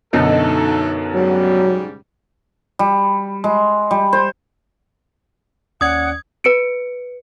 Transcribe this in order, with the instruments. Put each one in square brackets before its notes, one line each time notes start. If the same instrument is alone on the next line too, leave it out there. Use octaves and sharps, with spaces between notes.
[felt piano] F#2 B2 D3 [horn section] F#3 A3 A4 [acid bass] D#4
[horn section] G#2 C#3 G3 [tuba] F#3
[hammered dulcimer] G3
G#3
G3
C5
[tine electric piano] D#2 C#4 D5 [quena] F#5 [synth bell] D#6 G#6
[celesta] B4 C#7 D7